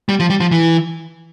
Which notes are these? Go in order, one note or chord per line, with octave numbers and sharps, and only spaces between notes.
G3
F3
G3
F3
E3